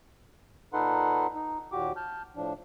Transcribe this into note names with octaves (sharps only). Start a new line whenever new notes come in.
A#2 D#4 A4 B4 F#5 C6
D#4
D#2 A#2 F#4 G4 D6
A5 F6 G6
A2 F3 D4